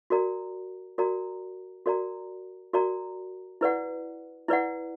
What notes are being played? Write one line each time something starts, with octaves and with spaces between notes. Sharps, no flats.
F#4 A#4 D5 A#5
F#4 A#4 D5 A#5
F#4 A#4 D5 A#5
F#4 A#4 D5 A#5
E4 B4 D5 F#5
E4 B4 D5 F#5